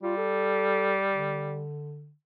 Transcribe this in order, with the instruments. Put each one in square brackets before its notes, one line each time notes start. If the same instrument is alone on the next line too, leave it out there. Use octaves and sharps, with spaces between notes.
[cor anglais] G3 [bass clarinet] F4
[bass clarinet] A4
D3